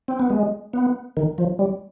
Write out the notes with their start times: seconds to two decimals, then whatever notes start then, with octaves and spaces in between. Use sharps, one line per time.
0.08 C4
0.19 B3
0.30 G#3
0.73 B3
1.17 D#3
1.38 F3
1.59 G3